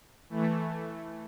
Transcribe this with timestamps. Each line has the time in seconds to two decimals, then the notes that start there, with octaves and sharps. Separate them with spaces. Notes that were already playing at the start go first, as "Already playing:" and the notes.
0.29 E3 A3